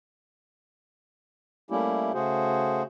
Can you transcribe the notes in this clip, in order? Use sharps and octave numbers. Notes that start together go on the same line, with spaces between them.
G3 A3 A#3 C#4 E4 G4
C#3 A3 F#4 G#4 C5